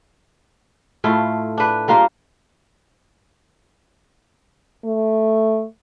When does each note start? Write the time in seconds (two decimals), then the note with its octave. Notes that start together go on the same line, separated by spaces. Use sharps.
1.04 A2 A3 E4 F4
1.58 D4 B4
1.88 G3 A#3 F4 A#4
4.85 A3